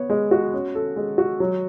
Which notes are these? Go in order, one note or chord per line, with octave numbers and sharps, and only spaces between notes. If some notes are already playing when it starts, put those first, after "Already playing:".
Already playing: B3 C#5
G#3
F#4
C#4
A4
G#3
F#4
F#3